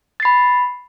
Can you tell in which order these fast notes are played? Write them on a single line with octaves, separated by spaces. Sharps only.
A6 C7 B5